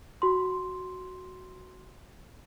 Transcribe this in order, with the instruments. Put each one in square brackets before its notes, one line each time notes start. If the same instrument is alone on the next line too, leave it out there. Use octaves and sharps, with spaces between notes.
[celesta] F#4 C6